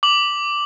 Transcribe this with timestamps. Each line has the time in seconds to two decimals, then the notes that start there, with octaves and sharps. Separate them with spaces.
0.03 D6 F#7